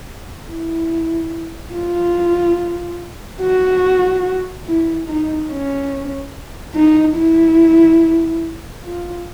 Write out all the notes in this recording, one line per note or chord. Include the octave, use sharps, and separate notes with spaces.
E4
F4
F#4
E4
D#4
C#4
D#4
E4
F4